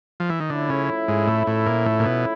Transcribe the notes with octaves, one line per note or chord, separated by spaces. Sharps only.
F3
E3
D#3
D3 F3 A3 C#4 E4
C#3
G#2
A2
A2
A#2
A2
A#2
B2